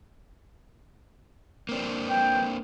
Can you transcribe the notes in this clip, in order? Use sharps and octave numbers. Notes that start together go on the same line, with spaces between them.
A#3 C4 D4
G5